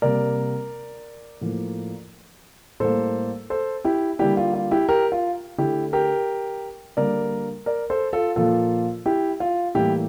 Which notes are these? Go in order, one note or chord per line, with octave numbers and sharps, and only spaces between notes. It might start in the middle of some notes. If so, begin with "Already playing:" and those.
C3 G3 A#3 A#4 D5
A2 F3 A#3
A2 G3 A#3 A4 C5
A4 C5
E4 G4
D3 G3 A#3 E4 G4
F4
F4
E4 G4
G4 A#4
F4
D3 A3 E4 G4
G4 A#4
D3 G3 A#3 A#4 D5
A#4 D5
A4 C5
F4 A4
A#2 F3 A#3 F4 A4
E4 G4
F4
A2 E3 G3 A#3 E4 G4